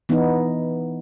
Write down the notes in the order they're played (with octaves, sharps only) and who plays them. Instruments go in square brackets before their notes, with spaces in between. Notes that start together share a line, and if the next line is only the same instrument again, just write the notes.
[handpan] E3 B3 D#4